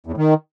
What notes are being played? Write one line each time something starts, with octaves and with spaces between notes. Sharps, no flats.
E2
A2
D#3